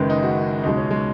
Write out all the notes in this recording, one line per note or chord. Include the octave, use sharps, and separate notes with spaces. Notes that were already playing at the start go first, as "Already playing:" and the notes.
Already playing: F#1 F#2 D#3 G#3 B4
D#4
F#4
C#2 B2 G#3 D#4
C#4
G#3